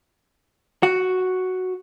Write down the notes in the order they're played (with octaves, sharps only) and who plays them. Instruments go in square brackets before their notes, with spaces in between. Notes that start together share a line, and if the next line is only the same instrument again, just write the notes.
[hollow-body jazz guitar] F#4